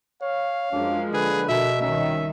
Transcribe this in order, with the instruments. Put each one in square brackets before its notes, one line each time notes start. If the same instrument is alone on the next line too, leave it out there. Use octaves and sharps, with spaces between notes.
[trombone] C#5 [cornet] F5
[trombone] F#2 [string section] F3 G#3 A#3 [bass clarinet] D4
[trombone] D3 [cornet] G#4 [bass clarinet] B4
[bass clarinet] B2 [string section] A#4 [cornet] E5
[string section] C2 D#3 [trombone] C#4 [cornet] E5